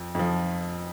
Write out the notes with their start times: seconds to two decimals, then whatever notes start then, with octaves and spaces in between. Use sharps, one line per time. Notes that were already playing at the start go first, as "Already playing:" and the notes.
Already playing: F2 F3
0.15 F2 F3